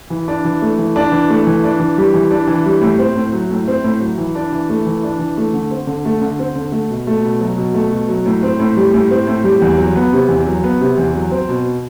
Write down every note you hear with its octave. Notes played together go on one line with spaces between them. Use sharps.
E3
D4
E3
A3
E3
D4
E3
A3
E3
D4
E3
G3
E3
D4
E3
G3
A2
C4
A2
F#3
A2
C4
A2
F#3
E3
D4
E3
A3
E3
D4
E3
A3
D3
C4
D3
A3
D3
C4
D3
A3
B2
A3
B2
F#3
B2
A3
B2
F#3
A2
C4
A2
G3
A2
C4
A2
G3
E2
F#3
B3
C3
E2
F#3
B3
C3
E2
F#3
C4
B2